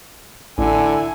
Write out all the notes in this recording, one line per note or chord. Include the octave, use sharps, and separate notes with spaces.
A1 D3 E4 G#5